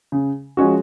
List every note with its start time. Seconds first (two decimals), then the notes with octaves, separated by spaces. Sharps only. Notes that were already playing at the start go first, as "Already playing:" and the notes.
0.12 C#3
0.57 F3 G#3 C#4 F#4